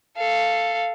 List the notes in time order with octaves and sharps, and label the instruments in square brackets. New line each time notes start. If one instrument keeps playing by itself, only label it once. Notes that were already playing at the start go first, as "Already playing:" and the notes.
[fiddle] A4 F5